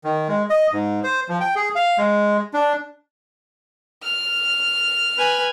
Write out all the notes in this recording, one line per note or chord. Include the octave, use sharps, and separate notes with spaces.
D#3
G#3
D#5
G#2
C5
F3
G5
G#4
F5
G#3
D4
F6
B4 G#5